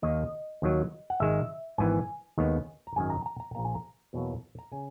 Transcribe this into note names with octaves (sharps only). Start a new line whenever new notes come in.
D#2 D#3 A#3 D#5
D#2 D#3 F#3
F#5
G#1 G#2 D#3 G#3 E5
G#1 G#2 E3 B3 G#5
D#2 D#3 G#3 B3
A#5
G#1 F#2 D#3 G#5
A#5
A#5
A#5
A#1 A#2 A#3 A#5
G#5
A#5
E2 B2 F#3 A#3
A#5
C#3 G#5